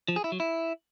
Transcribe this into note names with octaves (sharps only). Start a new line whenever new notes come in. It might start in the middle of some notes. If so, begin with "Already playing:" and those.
F3
G#4
E4
F#3
E4